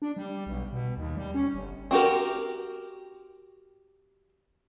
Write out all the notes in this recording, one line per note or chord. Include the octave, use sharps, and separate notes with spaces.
D4
G3
B1
B2
D#2
G3
C#4
G1
C4 F#4 G4 A#4